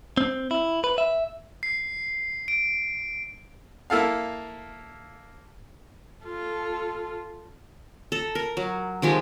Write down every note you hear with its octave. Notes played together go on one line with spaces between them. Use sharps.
C4
E4
B4
E5
C7
D7
A#3 E4 A4 F5
F4 A4
A4 A#5
A#4
F#3
D#3 F3 G#3 G4